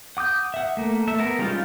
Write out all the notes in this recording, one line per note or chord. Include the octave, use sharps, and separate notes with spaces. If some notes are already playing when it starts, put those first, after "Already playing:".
F#5 D6 D#6 G6
E5 F#5
A3 A#3
A3 E5
B3 A#4
G3 G#3 C#4 D#4 F4